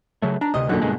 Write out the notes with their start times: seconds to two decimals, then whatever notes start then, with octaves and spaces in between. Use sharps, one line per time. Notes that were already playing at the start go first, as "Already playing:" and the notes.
0.22 C#3 F#3 A3
0.41 D4 A#5
0.54 D2 C3 D#5
0.69 E1 F#2 A#2 D3 F#3 F#6
0.81 G2 B2 G#3